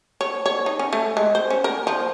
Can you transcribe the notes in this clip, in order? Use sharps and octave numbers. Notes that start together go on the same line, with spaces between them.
C#5
C#5
D#4
C#4
A3
G#3
C5
C#4
A#4
F3